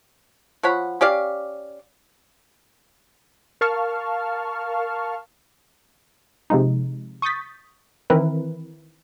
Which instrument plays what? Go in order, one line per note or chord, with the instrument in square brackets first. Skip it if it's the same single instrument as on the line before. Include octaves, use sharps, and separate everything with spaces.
[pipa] F3 C#5 F#5 B5
C#4 G4 D5 F5
[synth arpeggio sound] A#4 F5 A5 C#6 F6
[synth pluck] C3 F3 G#3 D#4
C#6 D#6 G6 A6 B6
D#3 E3 C4 E4 A#4 B4